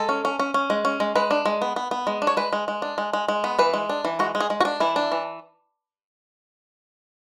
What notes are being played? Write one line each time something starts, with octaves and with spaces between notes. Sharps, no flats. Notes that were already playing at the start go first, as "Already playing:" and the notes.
Already playing: G#3 A4
C#4
C#4
C#4
C#4
G#3
C#4
G#3
G#3 B4
D4
G#3
B3
B3
B3
G#3
D4
C#5
G#3 B4
G#3
G#3
D4
G#3
G#3
G#3
B3
E3 B4
G#3
D4
E3
G#3 F#4
G#3
G#4
G#3
F#4
D4
E3 E4
D4
E3